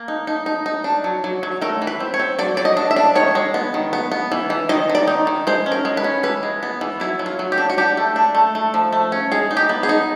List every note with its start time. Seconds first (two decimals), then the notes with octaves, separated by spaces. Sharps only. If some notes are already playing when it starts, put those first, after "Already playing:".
Already playing: A#3
0.08 D#4
0.27 D#4
0.46 D#4
0.66 D#4
0.84 D4
1.04 F#3
1.24 F#3
1.43 F#3
1.61 A3 A#4
1.82 E3
1.87 B4
2.00 C4
2.14 C#5
2.19 C4
2.39 F#3 D5
2.57 F#3 D5
2.65 D#5
2.77 D4
2.91 E5
2.96 D4
3.15 D#3 C#5
3.35 G#3
3.54 B3
3.74 D#3
3.93 B3
4.12 B3
4.32 E3
4.50 E3
4.69 D#3 D#5
4.89 D#3
4.95 D5
5.08 D#4
5.27 D#3
5.47 G#3 C5
5.66 C#4
5.72 A#4
5.85 G#3
5.97 B4
6.04 C#4
6.23 E3 B4
6.43 G#3
6.63 B3
6.81 E3
7.00 F#3 E4
7.19 F#3
7.26 F4
7.39 F#3
7.52 G4
7.58 D4
7.70 F#4
7.78 D4 G4
7.97 A3
8.16 D4
8.35 A3
8.55 A3
8.74 F3
8.93 A3
9.12 C#4
9.32 G#3 G#4
9.51 D#4
9.57 G4
9.69 B3
9.83 G#4
9.89 D#4